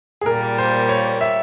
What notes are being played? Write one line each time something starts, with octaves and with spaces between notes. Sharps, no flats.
G#4
A#2 G3 A#3 A#4
C5
C#5
E5